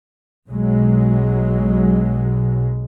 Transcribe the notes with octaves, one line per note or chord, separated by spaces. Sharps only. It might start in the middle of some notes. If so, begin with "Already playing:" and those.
B1 B2 F#3 G#3